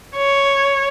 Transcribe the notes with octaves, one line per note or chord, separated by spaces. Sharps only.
C#5